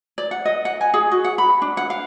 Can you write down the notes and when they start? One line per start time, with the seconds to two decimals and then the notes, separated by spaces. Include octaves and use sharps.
0.18 D5
0.31 F#5
0.45 D#5
0.65 F#5
0.81 G#5
0.94 G#4
1.12 F#4
1.24 F#5
1.38 B5
1.62 D4
1.77 F#5
1.90 F5